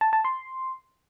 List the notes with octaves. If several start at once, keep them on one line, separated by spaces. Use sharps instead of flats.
A5
A5
C6